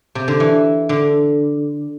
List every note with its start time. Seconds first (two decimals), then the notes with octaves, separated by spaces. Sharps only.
0.15 C3
0.28 D3
0.40 E3
0.89 D3